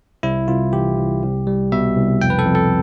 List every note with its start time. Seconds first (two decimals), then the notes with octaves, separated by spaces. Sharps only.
0.23 C2 E4
0.48 C2 F4
0.73 E3 G4
0.97 C2
1.23 C2
1.47 G3
1.72 B2 E5
1.96 C2
2.21 F2 G5
2.30 B4
2.39 A4
2.46 F2
2.55 A4